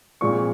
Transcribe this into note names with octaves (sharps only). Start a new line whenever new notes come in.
A#2 F3 G#3 C4 C#6